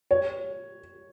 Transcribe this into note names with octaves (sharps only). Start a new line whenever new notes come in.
C#5